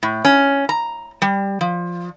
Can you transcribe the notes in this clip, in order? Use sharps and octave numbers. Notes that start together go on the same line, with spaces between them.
A2
C#4
A#5
G3
F3